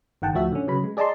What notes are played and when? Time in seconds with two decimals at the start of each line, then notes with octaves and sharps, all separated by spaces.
0.22 G1 D#3 F#5 G5 A5
0.33 D2 A2 F3 F#4 E5
0.52 D3 C#4
0.68 C#3 F#3 B4 B5
0.84 G#3
0.97 G#4 D5 D#5 A5 A#5 C6